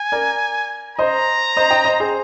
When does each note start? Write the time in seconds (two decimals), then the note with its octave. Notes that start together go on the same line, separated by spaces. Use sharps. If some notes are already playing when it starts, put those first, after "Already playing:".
Already playing: G#5
0.12 A#4 D5
0.98 C5 D#5 A#5
1.57 C5 D#5
1.71 D#5 G5
1.85 C5 D#5
2.00 G#4 C5